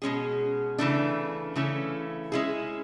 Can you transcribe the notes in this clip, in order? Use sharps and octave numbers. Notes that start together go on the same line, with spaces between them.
B2 G#3 C#4 G#4
C#3 E3 A3 D4
C#3 E3 A3 C#4
G#3 C#4 E4 G#4